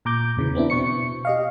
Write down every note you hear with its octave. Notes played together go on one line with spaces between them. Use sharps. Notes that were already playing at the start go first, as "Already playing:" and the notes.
A#2 A#5 D6 G6
E2 C#3 E3
B3 C4 D4 E4
B2 C#6 C#7
G4 D#5 F5